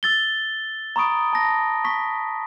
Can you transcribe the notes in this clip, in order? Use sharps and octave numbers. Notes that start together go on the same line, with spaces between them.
E6 A6 G7
A#5 B5 C#6 D#6 D7
A5 A#6
C#6 B6